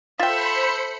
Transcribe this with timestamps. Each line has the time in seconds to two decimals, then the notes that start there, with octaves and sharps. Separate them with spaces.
0.20 F4 A4 C5 E5 G5 B5 C#7